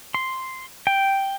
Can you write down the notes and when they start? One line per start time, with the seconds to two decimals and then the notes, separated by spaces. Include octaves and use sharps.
0.14 C6
0.87 G5